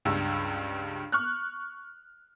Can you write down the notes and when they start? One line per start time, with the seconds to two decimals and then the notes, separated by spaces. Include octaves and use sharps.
0.05 C#2 G2 E6
1.12 C#6 F6 F#6